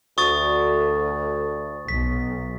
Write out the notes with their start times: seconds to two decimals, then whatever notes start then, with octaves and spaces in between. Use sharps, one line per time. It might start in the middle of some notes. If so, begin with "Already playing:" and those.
0.18 D2 C#6 D#6 A6
1.88 B1 B6